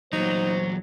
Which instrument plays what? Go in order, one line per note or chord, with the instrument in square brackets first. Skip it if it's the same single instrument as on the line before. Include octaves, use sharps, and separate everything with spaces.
[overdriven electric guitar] E2 A#2 [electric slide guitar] F#3 [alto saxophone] D#4 [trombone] C5